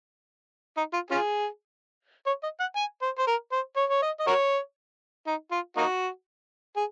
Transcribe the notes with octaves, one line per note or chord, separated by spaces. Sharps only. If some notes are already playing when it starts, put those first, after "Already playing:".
D#4
F4
C#4 F4 G#4
C#5
D#5
F#5
G#5
C5
C5
A#4
C5
C#5
C#5
D#5
D#5
F#4 A#4 C#5
D#4
F4
A#3 D#4 F#4
G#4